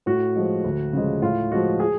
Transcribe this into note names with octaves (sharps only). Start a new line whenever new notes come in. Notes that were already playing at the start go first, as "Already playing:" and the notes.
A2 F#4
F3 G#3
D2
C#3 F3 G#3
A2 F4
F3 G#3 F#4
G#4